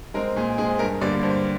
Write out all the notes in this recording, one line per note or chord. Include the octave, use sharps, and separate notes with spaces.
G#3 C4 A#4
A#2 G#4
G#3 C4 G#4
G2 A#4
D3 G3 A#3 D5
G2 C5